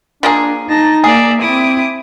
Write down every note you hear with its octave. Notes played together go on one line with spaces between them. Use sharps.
F3 A#3 D4 G#4
D#4 A5 A#6
A#3 G#4 D5 E5
C4 E4 D6 D#6